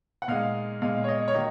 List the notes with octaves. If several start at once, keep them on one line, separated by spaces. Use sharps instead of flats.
F#5
A#2 G#3 D#4 F5
A#2 G#3 D#4 F5
C#5
D#5
C#5
D#3 F#3 A#3 D#5